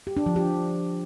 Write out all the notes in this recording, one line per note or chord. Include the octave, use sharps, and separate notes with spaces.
G4
D4
F3
G4